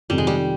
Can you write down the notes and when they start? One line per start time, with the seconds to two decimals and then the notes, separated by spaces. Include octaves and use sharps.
0.09 F1 F2 C3 D#3 G3
0.18 G#3
0.27 G3